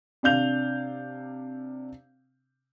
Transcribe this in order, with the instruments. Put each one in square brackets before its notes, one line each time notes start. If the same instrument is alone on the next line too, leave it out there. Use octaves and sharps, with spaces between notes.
[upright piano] C3 D4 F5 G6 F7